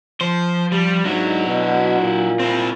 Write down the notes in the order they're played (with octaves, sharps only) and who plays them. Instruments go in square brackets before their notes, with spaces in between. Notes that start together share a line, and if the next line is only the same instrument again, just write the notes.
[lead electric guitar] F3 [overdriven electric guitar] C5
[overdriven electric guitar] G3
[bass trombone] G#2 [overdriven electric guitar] F#3 [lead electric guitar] D4 E4
[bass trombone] B2
A#2
[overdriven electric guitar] C4 E4